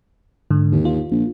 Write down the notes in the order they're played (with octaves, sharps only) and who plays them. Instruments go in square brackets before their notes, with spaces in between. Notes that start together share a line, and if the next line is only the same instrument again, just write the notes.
[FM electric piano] G#2 D3
[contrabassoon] D#2
[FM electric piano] F4
[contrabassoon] A#1